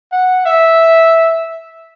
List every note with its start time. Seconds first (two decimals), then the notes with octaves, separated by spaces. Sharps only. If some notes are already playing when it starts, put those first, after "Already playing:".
0.12 F#5
0.46 E5